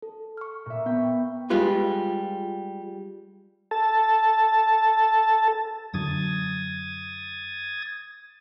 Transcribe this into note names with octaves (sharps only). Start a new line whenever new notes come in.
A4
C#6 F6
A#2 E5
B3 G5 B5 C#6
G3 G#3 F4 B4
A4 A5
F#2 D3 F#3 D#6 G#6 A6